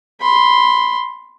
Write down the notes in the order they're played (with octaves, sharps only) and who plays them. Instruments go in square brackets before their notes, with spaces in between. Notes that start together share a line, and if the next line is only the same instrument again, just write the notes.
[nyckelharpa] B5 C6